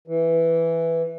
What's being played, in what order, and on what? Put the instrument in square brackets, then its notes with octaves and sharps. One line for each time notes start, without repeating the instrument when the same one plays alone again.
[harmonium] E3